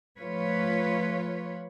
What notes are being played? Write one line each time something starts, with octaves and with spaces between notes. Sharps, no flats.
F3 A3 F4 B4 C#5